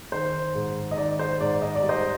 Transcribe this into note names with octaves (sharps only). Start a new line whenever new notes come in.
D#3 C5
G#2
D#5
D#3 D5
C5
G#2 D5
D#5
D5
G3
C5 D#5